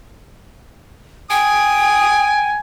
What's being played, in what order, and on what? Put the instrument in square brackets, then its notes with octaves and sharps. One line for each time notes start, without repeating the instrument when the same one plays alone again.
[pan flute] G5 [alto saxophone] G#5 [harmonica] D#6